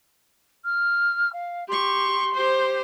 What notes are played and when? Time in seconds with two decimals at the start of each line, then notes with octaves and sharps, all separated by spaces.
0.64 F6
1.32 F5
1.68 G4 C6 C#6
2.34 G4 C5